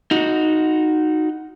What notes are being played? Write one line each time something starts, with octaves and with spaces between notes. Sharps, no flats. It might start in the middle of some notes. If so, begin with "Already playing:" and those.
D#4 F#4